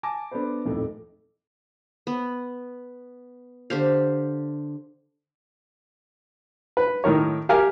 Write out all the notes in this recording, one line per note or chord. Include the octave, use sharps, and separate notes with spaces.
G#5 A5 D6 A#6
B3 D4 A4 B4 C5
D#1 F2 A2 D#3 A3
B3
D3 G4 C5 F5
B4
A2 D#3 A#4 C#5
G4 A#4 F5 G#5